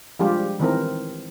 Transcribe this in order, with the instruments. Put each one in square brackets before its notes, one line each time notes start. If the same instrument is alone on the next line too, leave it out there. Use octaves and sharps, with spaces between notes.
[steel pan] F3 G3 G#3 D4 F4 G4
D#3 E3 C4 A#4